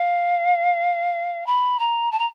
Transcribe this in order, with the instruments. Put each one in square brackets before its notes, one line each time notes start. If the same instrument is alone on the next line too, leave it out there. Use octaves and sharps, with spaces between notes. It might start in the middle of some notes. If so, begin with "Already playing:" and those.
Already playing: [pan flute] F5
B5
A#5
A5
A#5